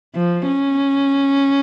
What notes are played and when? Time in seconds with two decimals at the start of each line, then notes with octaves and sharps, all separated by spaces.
0.15 F3
0.46 C#4